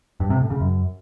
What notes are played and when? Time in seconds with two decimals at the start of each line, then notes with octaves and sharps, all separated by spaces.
0.20 G2
0.30 C3
0.40 A2
0.50 C#3
0.60 F#2